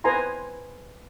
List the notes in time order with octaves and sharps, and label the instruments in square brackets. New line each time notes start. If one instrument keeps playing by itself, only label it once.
[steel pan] B4 C5 G#5 A#5 C6